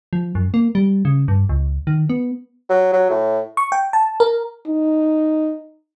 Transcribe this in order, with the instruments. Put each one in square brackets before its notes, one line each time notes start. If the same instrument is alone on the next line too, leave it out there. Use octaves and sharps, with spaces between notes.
[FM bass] F3
F#2
A#3
G3
C#3
G2
C#2
D#3
B3
[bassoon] F#3
F#3
A2
[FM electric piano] C#6
G5
A5
A#4
[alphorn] D#4